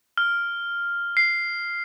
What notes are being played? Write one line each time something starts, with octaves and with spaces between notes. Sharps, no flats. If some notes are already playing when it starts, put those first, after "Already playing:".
F6
C7